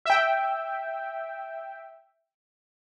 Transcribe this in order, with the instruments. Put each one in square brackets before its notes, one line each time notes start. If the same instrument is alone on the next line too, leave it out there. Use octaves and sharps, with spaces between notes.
[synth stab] E5 G5